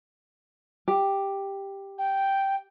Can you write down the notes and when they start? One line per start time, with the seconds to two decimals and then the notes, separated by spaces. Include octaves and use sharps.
0.88 G4
1.98 G5